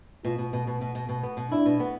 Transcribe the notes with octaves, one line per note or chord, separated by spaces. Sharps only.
B2 F4
B2
B2
B2
B2
B2
B2
B3
B2
D4 E4
B2
B3